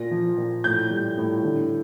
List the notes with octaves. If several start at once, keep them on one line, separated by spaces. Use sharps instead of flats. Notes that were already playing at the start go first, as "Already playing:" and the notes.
Already playing: A#2 A#6
F3
A#2
A2 G6
G3
A2
D3